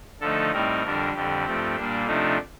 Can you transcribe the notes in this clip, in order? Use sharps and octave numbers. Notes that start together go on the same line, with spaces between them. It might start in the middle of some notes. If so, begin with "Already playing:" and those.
D3 F3 A3 D#4 A4
A2 G3 C4 D#4 A#4
F2 D3 G3 D4
F2 D3 G3 G4
G2 F3 A3 C4
A#2 G3 A#3 D4
C3 F3 A3 D4 D#4